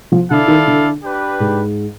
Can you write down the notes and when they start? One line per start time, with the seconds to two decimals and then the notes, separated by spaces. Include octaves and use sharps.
0.12 F3
0.30 D3 E4 A4 D5 F5
0.48 D#3
0.67 D3
1.03 D4 G4 B4
1.40 G#2